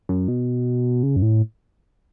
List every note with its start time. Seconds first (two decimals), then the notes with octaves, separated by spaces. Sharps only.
0.09 F#2
0.28 B2
1.03 C#3
1.16 F#2
1.22 A2